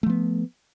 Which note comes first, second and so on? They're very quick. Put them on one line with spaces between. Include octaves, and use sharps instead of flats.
A3 F3 B3